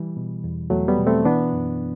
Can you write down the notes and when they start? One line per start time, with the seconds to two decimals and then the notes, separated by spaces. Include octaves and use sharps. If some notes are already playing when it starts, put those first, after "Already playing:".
Already playing: E3 G3
0.17 B2
0.44 E2
0.70 E2 F#3 A3
0.88 G3 B3
0.98 B2
1.07 A3 C4
1.25 E3 B3 D4
1.53 F#2